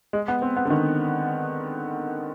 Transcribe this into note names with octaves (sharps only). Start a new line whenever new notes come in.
G#3
B3
C4
B3
D3
D#3